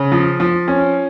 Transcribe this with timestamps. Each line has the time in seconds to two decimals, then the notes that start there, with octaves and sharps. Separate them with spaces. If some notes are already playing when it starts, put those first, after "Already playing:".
Already playing: C#3
0.12 F3
0.40 F3
0.68 C#4